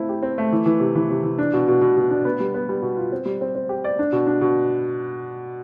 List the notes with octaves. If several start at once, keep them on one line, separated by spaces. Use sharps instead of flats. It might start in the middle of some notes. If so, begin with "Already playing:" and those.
Already playing: A3 C4 E4
G4
C4
A3
E3
E3
C3
E3
C3
E3
D4
B2
B2
B2
B2
D4
B3
G3
B3
G3
B2
F4
C4
G3
C4
C4
G4
D5
D4
B2
D4
B2